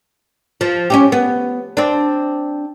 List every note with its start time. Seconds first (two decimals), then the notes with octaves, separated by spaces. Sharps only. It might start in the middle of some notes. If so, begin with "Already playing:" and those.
0.61 F3
0.90 C#4 D#4 G4
1.12 B3
1.77 C4 D4